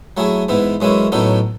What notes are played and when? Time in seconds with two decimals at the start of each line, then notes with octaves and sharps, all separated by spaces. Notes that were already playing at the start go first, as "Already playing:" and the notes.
0.17 F#3 A3 E4 G#4
0.48 G#2 E3 B3 E4
0.81 F#2 E3 G#3 C#4 E4
1.12 A2 F#3 B3 D#4 A4